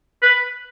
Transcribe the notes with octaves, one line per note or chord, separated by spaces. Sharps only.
B4